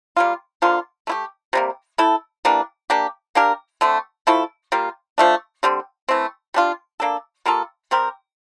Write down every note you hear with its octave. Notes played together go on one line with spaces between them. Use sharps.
G3 A#3 F4
D3 F3 A#3 F4
A3 E4 G4
C3 G3 A#3
A3 E4 A4
E3 G3 A#3 D4
A#3 D4 G4
A#3 D4 G4 A#4
D3 A3 C4
F3 A3 E4 A4
G3 A#3 F4
F3 A3 D4
D3 G3 C4
E3 A3 C4
G3 D4 F4
A#3 D4 A4
G3 A#3 F4 A4
G3 C4 G4 A#4